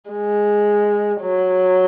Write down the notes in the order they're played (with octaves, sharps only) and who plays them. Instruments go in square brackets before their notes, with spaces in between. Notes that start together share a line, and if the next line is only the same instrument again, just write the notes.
[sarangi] G#3
F#3